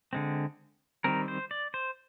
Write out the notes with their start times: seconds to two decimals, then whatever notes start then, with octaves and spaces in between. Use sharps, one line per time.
0.13 D3 G#3 C4
1.04 D#3 G3 C4 A#4
1.28 C5
1.51 D5
1.74 C5